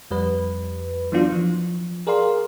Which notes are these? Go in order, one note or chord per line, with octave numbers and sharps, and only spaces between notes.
F2 G3 B4
E3 F#3 B3 D4 F4
F3
G#4 A#4 D5 F5 C6